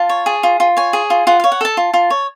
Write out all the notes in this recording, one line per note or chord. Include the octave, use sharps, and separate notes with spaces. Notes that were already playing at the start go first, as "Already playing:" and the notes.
Already playing: F4 A5
C#5
G#4
F4
F4
C#5 G#5
G#4
F4
F4 F#5
C#5 F5
F#5
A4 A5
F4
F4
C#5